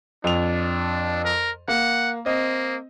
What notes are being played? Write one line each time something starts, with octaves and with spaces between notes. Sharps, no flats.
F2 D4 F7
A#4
A#3 F#5
A#3 C4 D#5